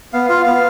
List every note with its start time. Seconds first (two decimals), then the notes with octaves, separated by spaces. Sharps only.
0.13 B3 F5
0.29 F4 F5
0.46 B3 F5